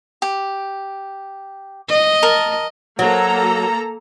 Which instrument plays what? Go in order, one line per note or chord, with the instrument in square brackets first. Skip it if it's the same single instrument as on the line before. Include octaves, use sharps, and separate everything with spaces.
[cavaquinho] G4
[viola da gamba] D#5
[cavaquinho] A#4 A5
[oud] F#3 [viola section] A#3 A4 A#5